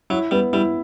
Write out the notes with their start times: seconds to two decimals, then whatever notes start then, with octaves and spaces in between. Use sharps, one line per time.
0.10 F#3 E4
0.31 G3 B3
0.53 G3 E4